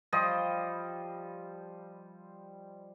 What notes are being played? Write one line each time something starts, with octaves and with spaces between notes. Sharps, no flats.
F3 G3 C5 D#5